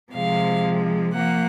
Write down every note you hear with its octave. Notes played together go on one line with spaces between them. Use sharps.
C3 F3 G#3 F5
F3 A#3 F#5